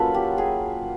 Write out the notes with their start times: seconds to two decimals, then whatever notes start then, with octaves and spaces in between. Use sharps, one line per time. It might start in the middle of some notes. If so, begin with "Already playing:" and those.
Already playing: F#3 A#3 C#4 F4 A4 B4
0.14 G4
0.38 G#4